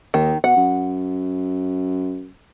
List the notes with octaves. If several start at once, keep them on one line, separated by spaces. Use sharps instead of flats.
D#2 D#3
B2 F#5
F#2